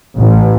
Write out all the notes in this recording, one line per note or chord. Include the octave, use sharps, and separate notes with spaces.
A1